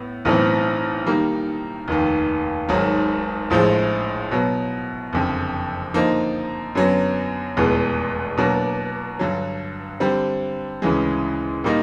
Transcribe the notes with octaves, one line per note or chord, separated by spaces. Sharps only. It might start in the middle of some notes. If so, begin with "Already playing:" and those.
Already playing: A2 B3
B1 A2 E3 A3 C4
D#3 G3 A#3
F1 D#2 D#3
G#1 G#2 D#3 F#3
A#1 A2 F3 G#3
B2 F#3 B3
F#1 F2 D3
D3 F3 A#3 D#4
F#2 D3 F#3 B3
F1 E2 B2 G#3
B2 F#3 A#3 D4
G2 D3 F#3
D3 G3 C4
D2 C#3 E3 G#3
A#2 G3 A#3 D#4